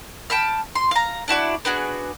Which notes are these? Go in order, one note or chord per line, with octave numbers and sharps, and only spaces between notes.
G5 A5 B5 F6
C6
F5 A#5
D4 E4 F#4 D5
B3 D4 F#4 G#4